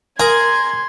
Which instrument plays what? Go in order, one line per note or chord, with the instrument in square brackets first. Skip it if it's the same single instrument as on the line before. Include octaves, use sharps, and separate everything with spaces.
[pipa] G#4 [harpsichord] A#4 [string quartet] C6 [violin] G#6